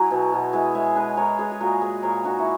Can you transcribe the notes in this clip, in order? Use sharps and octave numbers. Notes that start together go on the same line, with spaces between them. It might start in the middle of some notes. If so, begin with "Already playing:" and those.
Already playing: F#3 E4 G#4
B2
B2
G#3 E4 G#4
G#3 C#5 E5
G#3 B4 D#5
G#3 A#4 C#5
G#3 G#4 B4
G#4
A#2 F#4 A#4
G#3 G#4 B4
A#2 A#4 C#5
G#3 D#4 F#4
E4